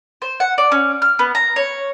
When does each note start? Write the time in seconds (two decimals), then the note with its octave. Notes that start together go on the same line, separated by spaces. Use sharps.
0.22 C5
0.40 F#5
0.58 D5
0.72 C#4
1.02 F6
1.19 B3
1.35 A#5
1.56 C#5